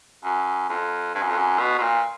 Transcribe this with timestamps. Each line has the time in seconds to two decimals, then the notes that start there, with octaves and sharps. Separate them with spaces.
0.24 F#2
0.70 F2
1.15 G2
1.22 F#2
1.30 F2
1.37 F#2
1.60 B2
1.78 B2
1.82 A#2